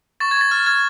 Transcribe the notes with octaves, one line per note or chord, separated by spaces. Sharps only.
C#6 A6
G#6
C#6 A6
F6 A6
F6 G#6